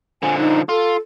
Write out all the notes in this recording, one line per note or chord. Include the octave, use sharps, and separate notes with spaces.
D3 F3 G#5
D#4
F4 A4